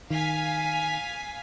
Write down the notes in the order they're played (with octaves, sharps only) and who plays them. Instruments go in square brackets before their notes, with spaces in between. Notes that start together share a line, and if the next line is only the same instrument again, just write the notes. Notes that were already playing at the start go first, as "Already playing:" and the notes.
[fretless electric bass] D#3 [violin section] F5 G#5 B6